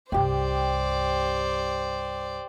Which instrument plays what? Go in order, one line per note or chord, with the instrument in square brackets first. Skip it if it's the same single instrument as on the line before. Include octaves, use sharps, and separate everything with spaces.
[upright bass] C2 G2 [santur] G4 G5 [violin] C5 D5